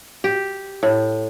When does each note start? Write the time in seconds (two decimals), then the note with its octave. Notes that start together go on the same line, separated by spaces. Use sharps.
0.24 G4
0.83 A2